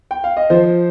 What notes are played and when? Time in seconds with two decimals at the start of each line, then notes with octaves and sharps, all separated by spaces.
0.11 G5
0.24 F5
0.37 D#5
0.50 F3 C5